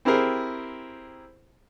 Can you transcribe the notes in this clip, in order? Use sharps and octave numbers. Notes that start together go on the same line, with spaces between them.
C4 E4 G4 G#4 A#4 C5